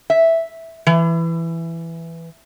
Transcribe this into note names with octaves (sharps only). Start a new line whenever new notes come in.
E5
E3